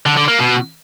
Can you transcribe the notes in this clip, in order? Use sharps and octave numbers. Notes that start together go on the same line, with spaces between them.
D3
D3
A#3
B2